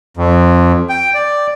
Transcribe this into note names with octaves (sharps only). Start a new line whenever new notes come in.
F2
G5
D5